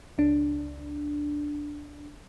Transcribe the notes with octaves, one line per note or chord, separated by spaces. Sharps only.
C#2 D4